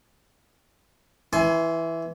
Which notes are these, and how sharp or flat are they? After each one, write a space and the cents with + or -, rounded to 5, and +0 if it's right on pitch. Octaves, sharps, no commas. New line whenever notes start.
E3 +0 G#5 +30 C6 +0